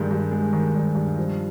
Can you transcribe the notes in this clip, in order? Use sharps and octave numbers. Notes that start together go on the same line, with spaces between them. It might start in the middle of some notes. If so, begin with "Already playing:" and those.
Already playing: G2 D#3 G#3
G2
G#3
D#3
G2
G2
F3